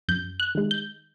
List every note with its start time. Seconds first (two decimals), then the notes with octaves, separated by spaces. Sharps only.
0.08 F#2 G6
0.40 F#6
0.55 D#3 G#3
0.71 G6